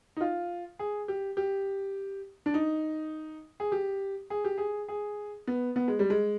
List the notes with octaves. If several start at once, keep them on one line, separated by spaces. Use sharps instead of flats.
D#4
F4
G#4
G4
G4
D4
D#4
G#4
G4
G#4
G4
G#4
G#4
B3
B3
G#3
G3
G#3